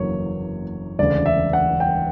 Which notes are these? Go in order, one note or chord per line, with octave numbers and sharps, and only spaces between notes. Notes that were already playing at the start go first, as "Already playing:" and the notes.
Already playing: F#1 E2 D3 F#3 A#3 C#5
E1 D2 C#3 D5
E5
F#5
G5